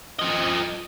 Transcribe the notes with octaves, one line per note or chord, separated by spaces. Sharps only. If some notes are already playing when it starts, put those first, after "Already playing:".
F3 D#5